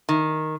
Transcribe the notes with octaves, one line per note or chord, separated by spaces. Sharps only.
D#3